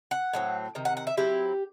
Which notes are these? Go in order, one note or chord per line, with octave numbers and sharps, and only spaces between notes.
F#5
A2 F#3 C4
C3 D#3
F#5
F#5
E5
F#3 C4 E4 G4